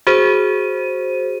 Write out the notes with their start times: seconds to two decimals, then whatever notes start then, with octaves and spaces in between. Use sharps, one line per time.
0.07 F#4 G#4 C5 D#7